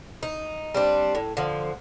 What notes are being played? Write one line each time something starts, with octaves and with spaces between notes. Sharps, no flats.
D#4
G3 C4 D4
A2
D3 F3